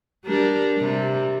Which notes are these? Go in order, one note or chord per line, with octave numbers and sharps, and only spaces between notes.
G3 D4 A#4
C3 G3